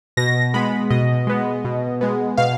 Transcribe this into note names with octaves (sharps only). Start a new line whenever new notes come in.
B2 A#6
G#3 B3 B5
B2 D#5
G#3 B3
B2
G#3 B3
B2 F5